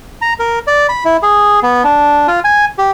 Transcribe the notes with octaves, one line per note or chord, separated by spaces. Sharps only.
A#5
A#4
D5
B5
E4
G#4
B3
D4
F4
G#5
G4